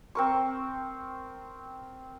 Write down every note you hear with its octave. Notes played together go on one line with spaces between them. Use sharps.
C4 A#4 C#6